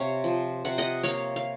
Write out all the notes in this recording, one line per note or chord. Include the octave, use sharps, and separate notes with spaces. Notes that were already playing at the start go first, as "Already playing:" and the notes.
Already playing: C3 C#5 F5
F3
C3 F#5
D#5 F#5
A#3 C#5 F5
F5